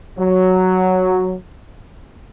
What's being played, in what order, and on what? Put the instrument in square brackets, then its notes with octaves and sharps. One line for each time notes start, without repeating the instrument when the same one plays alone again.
[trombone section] F#3